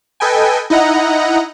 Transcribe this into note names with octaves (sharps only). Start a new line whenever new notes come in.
A4 B4 D#5 G5 G#5
D#4 E4 D#5 F#5 A#5